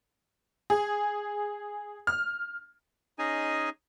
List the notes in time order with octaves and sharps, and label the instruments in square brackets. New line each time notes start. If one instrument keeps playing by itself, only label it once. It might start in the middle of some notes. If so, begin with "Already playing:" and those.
[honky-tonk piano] G#4
F6
[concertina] C#4 D#4 G#4 D#5 G#5